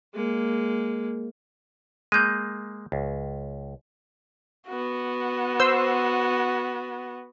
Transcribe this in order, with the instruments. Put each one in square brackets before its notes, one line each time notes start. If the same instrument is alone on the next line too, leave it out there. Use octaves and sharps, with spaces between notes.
[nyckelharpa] G#3 A#3
[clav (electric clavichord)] G#3 A#3 [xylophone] G6 D#7
[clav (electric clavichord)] C#2
[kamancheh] B3 F#4
[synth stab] C5 C6 E6